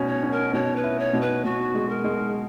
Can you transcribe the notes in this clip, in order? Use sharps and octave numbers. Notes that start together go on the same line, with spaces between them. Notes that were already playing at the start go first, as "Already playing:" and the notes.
Already playing: B2 C#4
C#5
C#4
A#4
B2 C#5
B4
E4
C#5
B2
B4
B2 F#4
G#3
A#4
G#3